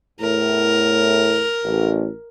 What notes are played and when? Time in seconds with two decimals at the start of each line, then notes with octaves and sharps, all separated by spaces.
0.20 E2 A2 A#4
1.64 A1